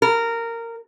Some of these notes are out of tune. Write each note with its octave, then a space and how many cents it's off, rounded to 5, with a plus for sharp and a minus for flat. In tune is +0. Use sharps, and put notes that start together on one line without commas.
A#4 -15